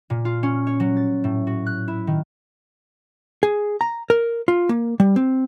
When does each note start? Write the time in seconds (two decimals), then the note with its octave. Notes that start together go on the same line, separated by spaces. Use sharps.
0.10 A#2
0.25 F4
0.43 C#4
0.67 C#5
0.80 F#3
0.97 A6
1.24 A2
1.47 F#4
1.66 F#6
1.88 E4
2.07 D#3
3.43 G#4
3.81 A#5
4.10 A#4
4.48 F4
4.69 A#3
5.00 G3
5.16 C4